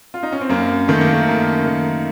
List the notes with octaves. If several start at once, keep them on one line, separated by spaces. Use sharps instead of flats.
F4
D#4
C#4
C4
F#2 A#3
D#3 A3
A#3
A3
F#2 A#3
D#3